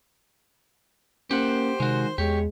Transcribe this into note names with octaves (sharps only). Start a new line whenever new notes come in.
A#3 C#4 G4 C5 F#5
C3 D#3 G#3 F#4
E2 G#3 G4 C#5